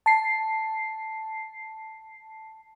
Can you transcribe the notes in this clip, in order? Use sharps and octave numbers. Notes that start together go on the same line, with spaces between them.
A5 C7